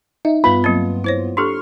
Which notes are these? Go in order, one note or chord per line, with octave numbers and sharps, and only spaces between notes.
D#4 E5
G2 B3 F4 B5
F#3 A#3 C4
E4 C5 C#5
D4 G4 A4 C6 C#6 F6